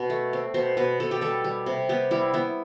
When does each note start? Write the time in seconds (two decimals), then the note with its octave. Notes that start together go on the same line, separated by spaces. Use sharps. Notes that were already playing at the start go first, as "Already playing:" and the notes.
Already playing: B2
0.10 A3
0.33 C4
0.54 B2 C5
0.77 B2 B4
1.00 B2 A4
1.11 G4
1.21 G3 A4
1.44 G3
1.66 C3
1.89 B3 G4
2.11 G3 E4
2.34 B3 E4